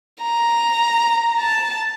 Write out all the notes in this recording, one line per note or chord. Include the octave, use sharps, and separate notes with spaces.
A#5
A5